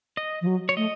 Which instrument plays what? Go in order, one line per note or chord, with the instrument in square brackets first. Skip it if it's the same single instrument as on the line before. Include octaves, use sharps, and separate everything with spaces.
[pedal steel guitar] D#5
[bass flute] F3
F#3
[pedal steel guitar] C#5
[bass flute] A3 [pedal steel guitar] D#5